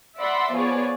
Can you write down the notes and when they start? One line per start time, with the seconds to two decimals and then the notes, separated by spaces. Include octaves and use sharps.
0.19 D5 E5 F#5 B5 C6
0.54 F3 B3 G#4 C#5 D5